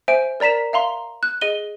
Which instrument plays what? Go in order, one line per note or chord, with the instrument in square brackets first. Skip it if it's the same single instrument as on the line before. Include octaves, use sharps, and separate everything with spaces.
[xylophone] C5 E5 G#5 D7
A#4 D5 A#5 B6 E7
E5 F5 A#5 C6
F#6
G#4 D#5 D#7 G7